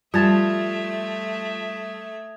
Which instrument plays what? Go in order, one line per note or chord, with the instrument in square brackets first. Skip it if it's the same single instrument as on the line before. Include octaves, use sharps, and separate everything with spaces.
[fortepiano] F3 A5 [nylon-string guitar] G3 [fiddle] A3 E5 [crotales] D#6 G#6 A#6